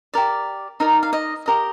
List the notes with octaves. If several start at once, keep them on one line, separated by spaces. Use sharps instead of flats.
G4 A#4 D5
D#4 A#4 D5
F5
D#5
G4 A#4 D#5